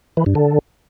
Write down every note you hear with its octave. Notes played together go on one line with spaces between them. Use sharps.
E3
G2
D3